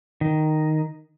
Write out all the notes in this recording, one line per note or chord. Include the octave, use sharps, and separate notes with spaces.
D#3